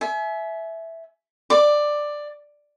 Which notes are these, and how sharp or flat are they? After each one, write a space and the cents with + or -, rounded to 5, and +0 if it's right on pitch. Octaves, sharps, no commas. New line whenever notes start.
E5 +0 G#5 +35
D5 +10 D6 +0